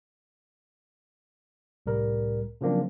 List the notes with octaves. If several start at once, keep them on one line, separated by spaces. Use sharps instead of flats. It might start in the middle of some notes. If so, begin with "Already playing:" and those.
C2 A2 G3 A#4
C#3 F3 F#3 A#3 C4 D4